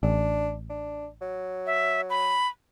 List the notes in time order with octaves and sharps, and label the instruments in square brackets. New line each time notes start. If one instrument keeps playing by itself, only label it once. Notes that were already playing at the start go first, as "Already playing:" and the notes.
[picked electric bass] A1 [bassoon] D4
[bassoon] D4
F#3
[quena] E5
B5